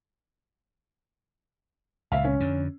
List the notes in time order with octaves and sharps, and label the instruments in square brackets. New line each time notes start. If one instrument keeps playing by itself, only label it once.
[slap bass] C#2 A#2 [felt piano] E5 F5
[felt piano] C#4
[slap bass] F2 D3